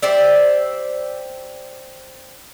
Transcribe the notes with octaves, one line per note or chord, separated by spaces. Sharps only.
G4 C5 D5 E5